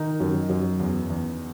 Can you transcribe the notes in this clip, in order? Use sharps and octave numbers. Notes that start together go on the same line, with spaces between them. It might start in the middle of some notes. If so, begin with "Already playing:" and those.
Already playing: D#3 D#4
F#2
F#2
E2
E2